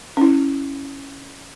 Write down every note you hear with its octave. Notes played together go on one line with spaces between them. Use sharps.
C#4 E4